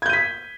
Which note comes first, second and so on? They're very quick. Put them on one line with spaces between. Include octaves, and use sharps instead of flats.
G#6 G6 D#7 B6